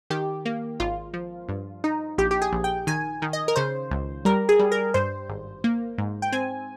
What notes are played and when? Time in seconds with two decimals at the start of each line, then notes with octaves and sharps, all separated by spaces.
0.10 D#3 G4
0.45 A#3
0.80 G#1 F4
1.14 F3
1.49 G2
1.84 D#4
2.18 A#1 G4
2.31 G4
2.42 G#4
2.52 A#1
2.64 G5
2.87 D#3 G#5
3.22 D#3
3.33 D#5
3.48 A#4
3.56 C#3 C5
3.91 C#2
4.25 G3 A#4
4.49 G#4
4.59 G3
4.72 A#4
4.94 G2 C5
5.29 G#1
5.64 A#3
5.98 G#2
6.22 G5
6.32 C4 G#5